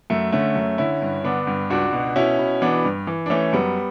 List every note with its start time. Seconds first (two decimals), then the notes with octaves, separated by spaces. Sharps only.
0.10 F#2 A3
0.32 D3 A3 C#4
0.56 F#2
0.78 D3 C#4 E4
1.02 G2
1.24 D3 B3 D4
1.47 G2
1.70 C#2 D4 F#4
1.93 B2
2.16 B2 C#4 E4
2.39 B2
2.62 E3 B3 D4
2.85 G2
3.07 E3
3.26 D4
3.30 E3 A3 C#4
3.53 F#2 G3 B3